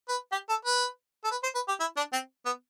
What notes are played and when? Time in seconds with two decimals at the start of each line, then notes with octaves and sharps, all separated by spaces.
0.09 B4
0.32 G4
0.49 A4
0.65 B4
1.24 A4
1.31 B4
1.43 C5
1.55 B4
1.68 G4
1.80 E4
1.97 D4
2.13 C4
2.46 B3